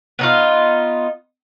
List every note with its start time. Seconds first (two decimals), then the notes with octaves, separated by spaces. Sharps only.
0.19 B3 D#4 F4